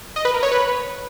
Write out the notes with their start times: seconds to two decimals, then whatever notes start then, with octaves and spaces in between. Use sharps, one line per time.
0.16 D#5
0.25 B4
0.34 A#4
0.43 C#5
0.52 B4